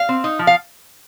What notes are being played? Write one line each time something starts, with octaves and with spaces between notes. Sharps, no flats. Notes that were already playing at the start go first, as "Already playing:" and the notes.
Already playing: F5
C4
D#4
F3
F5